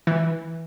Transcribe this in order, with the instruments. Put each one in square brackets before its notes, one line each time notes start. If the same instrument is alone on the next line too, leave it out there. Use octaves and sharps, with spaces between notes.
[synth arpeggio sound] E3